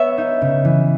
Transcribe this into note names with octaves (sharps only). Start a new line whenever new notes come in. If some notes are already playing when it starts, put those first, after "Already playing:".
Already playing: B3 B4 C#5 E5
D#4
C#3
E3